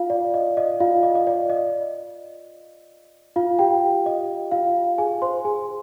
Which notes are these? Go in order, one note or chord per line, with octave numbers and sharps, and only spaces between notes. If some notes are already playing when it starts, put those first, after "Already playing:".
Already playing: F4 F5
D5
D#5
D#5
F4 F5
D#5
D#5
D5
D#5
F4 F5
G4 G5
D#5
F4 F5
G#4 G#5
C5 C6
G#4 G#5